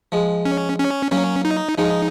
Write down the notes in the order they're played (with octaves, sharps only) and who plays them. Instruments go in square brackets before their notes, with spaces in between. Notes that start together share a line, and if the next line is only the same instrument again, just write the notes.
[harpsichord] F3 G#3
[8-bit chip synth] C#4
C#4
[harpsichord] F#3 A#3 [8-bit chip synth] C#4
[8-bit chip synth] D#4
[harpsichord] F3 G#3 [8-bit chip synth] D#4